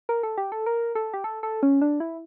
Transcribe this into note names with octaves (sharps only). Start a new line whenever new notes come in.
A#4
A4
G4
A4
A#4
A4
G4
A4
A4
C#4
D4
E4